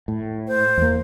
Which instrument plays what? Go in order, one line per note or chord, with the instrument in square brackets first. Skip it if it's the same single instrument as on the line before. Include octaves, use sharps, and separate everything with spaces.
[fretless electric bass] A2
[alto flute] C5
[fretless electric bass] E2 A#3